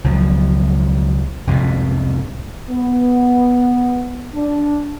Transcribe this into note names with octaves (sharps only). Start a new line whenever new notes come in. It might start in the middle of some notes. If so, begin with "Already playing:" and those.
C#2 B2 F3 F#3
C2 F2 G#2 B2
B3
D4